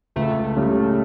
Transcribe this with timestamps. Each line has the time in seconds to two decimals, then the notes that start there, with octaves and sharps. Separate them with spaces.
0.16 C#2 A3
0.57 C#3 G3